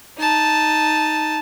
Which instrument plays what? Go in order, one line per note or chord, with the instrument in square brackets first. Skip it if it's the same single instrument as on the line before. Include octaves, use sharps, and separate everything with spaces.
[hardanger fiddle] D#4 A5